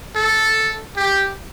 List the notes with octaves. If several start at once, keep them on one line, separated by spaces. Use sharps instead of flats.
A4
G4